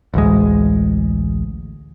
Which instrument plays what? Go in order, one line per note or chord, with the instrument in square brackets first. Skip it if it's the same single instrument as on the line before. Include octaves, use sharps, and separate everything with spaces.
[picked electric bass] A1 D2 G#3